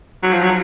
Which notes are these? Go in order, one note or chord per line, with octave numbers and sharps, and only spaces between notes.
F#3
F3
F#3